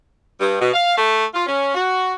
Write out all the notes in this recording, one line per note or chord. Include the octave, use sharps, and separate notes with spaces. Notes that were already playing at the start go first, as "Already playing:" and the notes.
G2
B2
F5
A3
F4
C#4
F#4